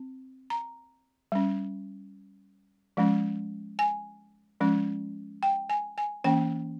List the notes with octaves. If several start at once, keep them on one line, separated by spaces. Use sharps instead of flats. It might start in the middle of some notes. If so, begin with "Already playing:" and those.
Already playing: C4
A#5
G3 C#4
F3 G#3 C#4
G#5
F3 G#3 C#4
G5
G#5
G#5
E3 A#3 C#4 G5